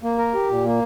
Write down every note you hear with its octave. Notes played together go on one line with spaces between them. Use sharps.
A#3
A#4
G4
A#2
A#3